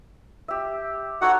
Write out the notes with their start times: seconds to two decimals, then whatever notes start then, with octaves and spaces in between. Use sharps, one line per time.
0.48 G4 E5
1.22 D#4 F#4 A4 C#5 F#5